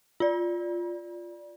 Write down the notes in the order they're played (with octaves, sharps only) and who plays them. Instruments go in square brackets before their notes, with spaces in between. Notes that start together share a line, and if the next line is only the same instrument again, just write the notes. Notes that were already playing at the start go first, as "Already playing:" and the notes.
[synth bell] F4 D5